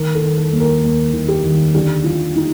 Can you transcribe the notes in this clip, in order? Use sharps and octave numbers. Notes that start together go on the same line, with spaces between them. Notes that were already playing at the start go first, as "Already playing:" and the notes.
Already playing: D#3 A#4
A4
D#3
A4
D#2
A#4
D#2
D#3
G4
D#3
D3 G4
D3 F4
D#4